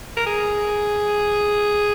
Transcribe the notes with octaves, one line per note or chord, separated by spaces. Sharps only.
A#4
G#4